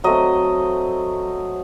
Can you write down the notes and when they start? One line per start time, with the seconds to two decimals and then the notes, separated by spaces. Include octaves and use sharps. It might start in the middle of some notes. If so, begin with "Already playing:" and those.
0.04 F#3 A3 C4 D#5